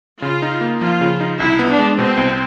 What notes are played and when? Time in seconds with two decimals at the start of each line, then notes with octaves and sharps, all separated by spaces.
0.22 C#3 F4
0.42 D#4
0.61 A#3
0.81 F3 F4
1.01 C#3
1.20 D#4
1.39 C2 E4
1.59 B3
1.68 D4
1.79 G#3
1.99 B2 C4
2.17 C2